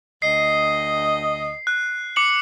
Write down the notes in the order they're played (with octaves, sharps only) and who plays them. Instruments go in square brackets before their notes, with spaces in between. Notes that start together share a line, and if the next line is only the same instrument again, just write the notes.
[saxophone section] D2 D#5 [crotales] C7
[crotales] F#6
D6 C#7 F#7